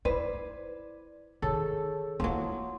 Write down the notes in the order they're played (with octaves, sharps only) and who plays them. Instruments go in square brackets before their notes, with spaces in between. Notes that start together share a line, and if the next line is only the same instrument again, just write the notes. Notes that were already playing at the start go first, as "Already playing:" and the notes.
[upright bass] E4 [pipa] B4 C5 [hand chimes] D5
[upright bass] D#3 [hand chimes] G#4 C#5 A5 [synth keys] A4
[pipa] F3 F#3 [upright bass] A#3 E4 [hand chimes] C6